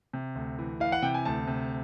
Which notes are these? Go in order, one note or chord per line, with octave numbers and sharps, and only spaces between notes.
C3
D2
E3
E3 F5
F#5
C3 G5
G#5
D2 A5
C3